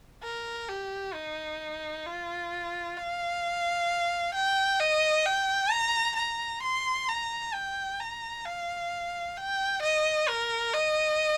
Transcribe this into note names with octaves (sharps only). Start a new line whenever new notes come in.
A#4
G4
D#4
F4
F5
G5
D#5
G5
A#5
A#5
C6
A#5
G5
A#5
F5
G5
D#5
A#4
D#5